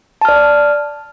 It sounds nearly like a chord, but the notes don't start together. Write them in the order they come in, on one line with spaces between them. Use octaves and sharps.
A5 F6 D5